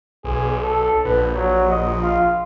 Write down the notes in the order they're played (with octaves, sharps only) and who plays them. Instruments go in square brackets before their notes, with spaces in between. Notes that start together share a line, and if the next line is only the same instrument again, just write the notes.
[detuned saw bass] B1 [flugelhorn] G#4
[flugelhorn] A4
[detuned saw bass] A#1 [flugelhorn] B4
[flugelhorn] F#3
D#5
F4